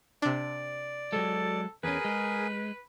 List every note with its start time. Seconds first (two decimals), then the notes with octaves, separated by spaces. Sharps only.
0.22 C3 D4 D5
1.13 F#3 G#3 A4
1.84 E2 C#4 G#4 A#4 B4 G#5
2.05 G#3